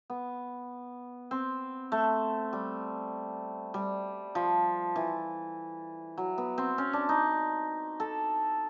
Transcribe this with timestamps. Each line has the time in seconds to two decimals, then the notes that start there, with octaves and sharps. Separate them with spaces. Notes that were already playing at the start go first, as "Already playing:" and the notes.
0.10 B3
1.31 C4
1.92 A3
2.53 G3
3.74 G3
4.35 F3
4.96 E3
6.18 F#3
6.38 B3
6.58 C4
6.78 C#4
6.93 D4
7.09 D#4
8.00 A4